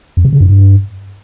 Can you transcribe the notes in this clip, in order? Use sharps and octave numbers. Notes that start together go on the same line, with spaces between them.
F2
C3
C#3
F#2
G2